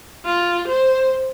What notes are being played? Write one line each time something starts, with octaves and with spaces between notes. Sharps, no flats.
F4
C5